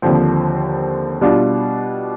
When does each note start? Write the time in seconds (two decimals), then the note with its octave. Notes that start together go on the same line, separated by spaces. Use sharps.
0.02 D#2 D3 F3 C4
1.21 B2 G3 D4 F4